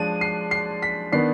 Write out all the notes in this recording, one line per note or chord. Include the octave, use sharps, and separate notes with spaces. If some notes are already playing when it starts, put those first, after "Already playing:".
Already playing: F3 G#3 D4 D#7
C7
C7
B6
D#3 B3 D4 C7